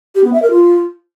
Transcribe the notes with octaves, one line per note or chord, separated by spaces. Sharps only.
G4
B3
E5
A#4
F4